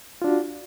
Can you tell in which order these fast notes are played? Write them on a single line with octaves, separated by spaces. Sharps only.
F4 D4 F#4